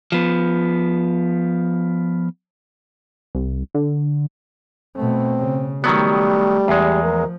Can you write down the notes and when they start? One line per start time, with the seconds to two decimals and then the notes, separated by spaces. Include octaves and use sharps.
0.12 F3 B3
3.35 C2
3.75 D3
4.96 B2 A3 C4
5.38 C#3
5.84 D#3 F#3 G3 A3 B3
6.68 E2 G#3
7.03 F3 A#4